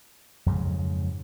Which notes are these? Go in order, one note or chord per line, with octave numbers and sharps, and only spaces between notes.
F2 G#2 C#3 F#3